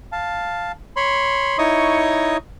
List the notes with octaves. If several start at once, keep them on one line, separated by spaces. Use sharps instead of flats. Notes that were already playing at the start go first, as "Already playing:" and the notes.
F5 A5
C#5 B5 C6
D#4 E4 C#5 D#5 C#6 D#6